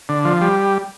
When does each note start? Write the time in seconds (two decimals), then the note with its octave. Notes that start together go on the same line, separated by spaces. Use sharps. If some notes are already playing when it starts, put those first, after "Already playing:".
0.09 D3
0.25 F3
0.41 G3